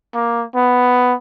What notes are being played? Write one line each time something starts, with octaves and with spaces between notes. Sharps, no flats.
A#3
B3